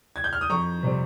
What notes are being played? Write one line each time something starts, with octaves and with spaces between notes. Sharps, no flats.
G#6
G6
F6
D#6
F2 A#5 C#6
C3 G3 C4